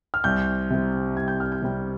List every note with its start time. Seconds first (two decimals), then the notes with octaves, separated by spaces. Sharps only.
0.14 F6
0.24 C2 G6
0.70 C3 G3
1.16 C2 G#6
1.28 G6
1.40 F6
1.52 G6
1.62 C3 G3